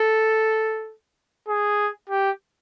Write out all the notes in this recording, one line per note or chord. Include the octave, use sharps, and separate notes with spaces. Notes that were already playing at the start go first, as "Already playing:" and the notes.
Already playing: A4
G#4
G4